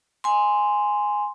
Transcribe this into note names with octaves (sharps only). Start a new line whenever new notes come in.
G#5 C6